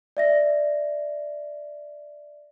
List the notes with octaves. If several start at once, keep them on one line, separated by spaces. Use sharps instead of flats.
D5 E5 A#6